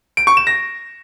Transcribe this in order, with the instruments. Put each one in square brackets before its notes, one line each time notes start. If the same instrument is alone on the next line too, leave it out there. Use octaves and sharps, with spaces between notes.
[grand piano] D7
C#6
E7
A#6